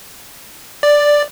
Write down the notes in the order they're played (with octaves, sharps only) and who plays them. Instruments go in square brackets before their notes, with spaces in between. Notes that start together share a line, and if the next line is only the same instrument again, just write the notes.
[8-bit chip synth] D5